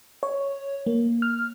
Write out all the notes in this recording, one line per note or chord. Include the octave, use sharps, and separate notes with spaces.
C#5
A#3
F6